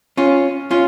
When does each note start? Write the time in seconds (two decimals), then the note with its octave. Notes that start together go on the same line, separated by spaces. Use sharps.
0.17 C#4 F4
0.71 C#4 F4